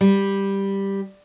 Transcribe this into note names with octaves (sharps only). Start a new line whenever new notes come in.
G3